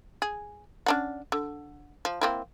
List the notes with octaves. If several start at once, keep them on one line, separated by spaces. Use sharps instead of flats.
G#4
C#4 D4 F#5
D3
F3
A#3 C4 E4